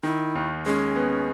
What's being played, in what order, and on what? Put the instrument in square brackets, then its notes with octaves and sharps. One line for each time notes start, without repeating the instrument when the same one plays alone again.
[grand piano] D#3 [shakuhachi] E4
[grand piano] D#2
[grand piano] G#3 [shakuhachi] C#4
[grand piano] B3